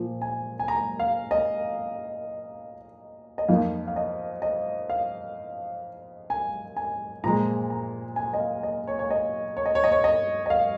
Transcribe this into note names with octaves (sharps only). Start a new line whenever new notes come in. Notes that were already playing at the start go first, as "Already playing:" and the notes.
Already playing: A#2 F3 A#3
G#5
G#5
A#5
F5
D#5
D#5
F2 F3 A#3 D#4 F5
F5
D#5
D#5
F5
G#5
G#5
A#2 F3 G#3 A#5
A#5
G#5
D#5
F5
D#5
C#5
C#5
D#5
C#5
D#5
C#5
D#5
C#5
D#5
D#5
F5